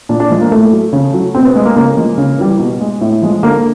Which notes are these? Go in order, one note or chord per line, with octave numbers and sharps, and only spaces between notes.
A#2 D4
D4
F3 G#3
A#3
A2 A3
F#3
C#3
F#3
B2 C4
B3
G#3
A#3
C#3 A#3
F3 G#3
C#3
E3 G3
B2
G#3
A2
F3 G#3
D3 A#3